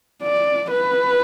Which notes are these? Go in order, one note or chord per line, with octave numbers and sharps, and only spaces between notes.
D5
B4